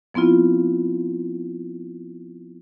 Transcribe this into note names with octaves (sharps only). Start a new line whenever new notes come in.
F3 B3 C4 E4 F4